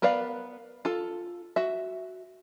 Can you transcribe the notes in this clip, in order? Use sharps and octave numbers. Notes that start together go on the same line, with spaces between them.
B3 A#4 B4 D5 F5
F4 A4
F#4 E5